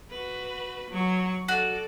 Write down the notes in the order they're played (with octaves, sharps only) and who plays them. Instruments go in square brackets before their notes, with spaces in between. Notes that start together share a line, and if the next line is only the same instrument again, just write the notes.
[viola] F#4 B4
F#3 C#6
[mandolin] F#4 [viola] A4 D5